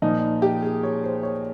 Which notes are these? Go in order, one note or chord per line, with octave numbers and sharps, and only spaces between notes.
A#2 F3 D#4
G4
G#4
C#5
C5
C#5